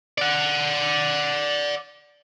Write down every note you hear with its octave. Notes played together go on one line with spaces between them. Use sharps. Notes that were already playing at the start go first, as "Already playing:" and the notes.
D5 F#5